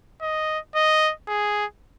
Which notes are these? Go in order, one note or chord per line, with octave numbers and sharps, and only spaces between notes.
D#5
D#5
G#4